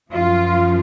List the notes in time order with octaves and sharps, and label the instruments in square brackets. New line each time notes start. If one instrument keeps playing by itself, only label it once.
[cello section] F#2 F3 F4